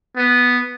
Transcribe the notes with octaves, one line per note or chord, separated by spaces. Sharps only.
B3